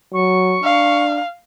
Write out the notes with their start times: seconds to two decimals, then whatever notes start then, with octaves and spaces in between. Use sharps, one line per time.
0.14 F#3 C#6
0.64 D4 F5